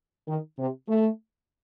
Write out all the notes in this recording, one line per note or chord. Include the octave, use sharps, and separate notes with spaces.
D#3
C3
A3